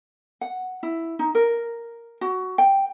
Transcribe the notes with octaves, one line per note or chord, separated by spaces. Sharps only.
F#5
E4
D#4
A#4
F#4
G5